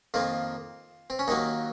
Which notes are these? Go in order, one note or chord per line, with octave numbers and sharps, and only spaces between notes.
F2 D#3 A#3 F4
C4
C#4
D#2 D#3 F#3 A#3 D#4